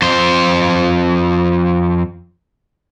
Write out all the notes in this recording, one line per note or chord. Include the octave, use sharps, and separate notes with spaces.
F2 C5